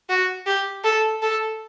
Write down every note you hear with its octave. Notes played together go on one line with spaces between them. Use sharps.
F#4
G4
A4
A4